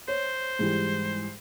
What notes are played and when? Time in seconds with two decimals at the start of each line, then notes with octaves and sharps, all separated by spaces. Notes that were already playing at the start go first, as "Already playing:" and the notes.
0.08 C5 C#5
0.59 G#2 E3 G3